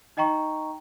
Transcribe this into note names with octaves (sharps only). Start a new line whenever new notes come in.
D#4 D#5 G5 A#5 C#6